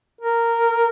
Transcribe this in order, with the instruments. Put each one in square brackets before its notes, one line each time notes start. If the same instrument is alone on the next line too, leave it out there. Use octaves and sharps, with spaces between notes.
[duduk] A#4